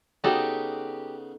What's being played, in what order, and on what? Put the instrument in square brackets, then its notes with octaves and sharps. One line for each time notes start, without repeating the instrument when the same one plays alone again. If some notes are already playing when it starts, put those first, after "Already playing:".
[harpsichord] C#3 B3 [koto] D#4 A4 [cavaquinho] F#4 G4